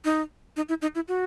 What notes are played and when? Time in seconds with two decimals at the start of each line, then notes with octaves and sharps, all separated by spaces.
0.05 D#4
0.56 D#4
0.69 E4
0.82 D#4
0.95 E4
1.08 F#4